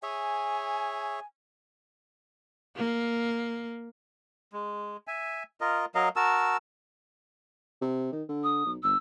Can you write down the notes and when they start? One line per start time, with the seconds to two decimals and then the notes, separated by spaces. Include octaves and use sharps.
0.03 G#4 C#5 E5 G#5
2.77 A#3
4.53 G#3
5.07 E5 G#5
5.61 F4 A#4 D#5
5.95 F#3 A#4 D#5 F5
6.16 F#4 A#4 A5 E6
7.82 C3
8.12 D#3
8.29 D3
8.44 D#6
8.66 B1
8.83 G1 E6